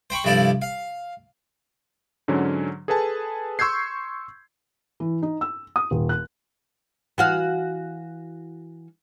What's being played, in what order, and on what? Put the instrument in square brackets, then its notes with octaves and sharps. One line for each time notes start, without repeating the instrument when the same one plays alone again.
[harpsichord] C5 G5 B5 C#6
C2 G2 F3 E4 A4 D5
F5
[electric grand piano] G#2 D3 F#3 C#4
G#4 A4 B4 G#5 A5
C6 C#6 E6 G6 G#6 C7
[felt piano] E3
D#4
E6
D#6
D#1
F#6
[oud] E3 F#4 F5